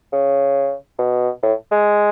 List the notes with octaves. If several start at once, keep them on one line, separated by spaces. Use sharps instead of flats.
C#3
B2
A2
G#3